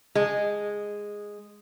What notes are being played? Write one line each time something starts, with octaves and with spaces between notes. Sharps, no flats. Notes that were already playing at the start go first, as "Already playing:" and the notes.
G#3